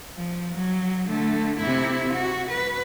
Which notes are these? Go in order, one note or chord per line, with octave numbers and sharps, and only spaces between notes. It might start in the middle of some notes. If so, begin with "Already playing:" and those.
F3
F#3
D3 A3
C3 E4
F#4
B4